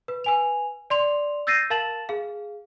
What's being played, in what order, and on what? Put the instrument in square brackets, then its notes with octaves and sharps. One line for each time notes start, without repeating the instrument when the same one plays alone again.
[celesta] B4
B4 G#5 F7
D5 C6 F7
E6 G6 A6 A#6 C7 D#7
A#4 F5 A5 A6 E7 F#7
G#4 F5